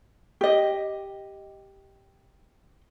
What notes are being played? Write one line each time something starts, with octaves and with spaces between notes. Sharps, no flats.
G4 D#5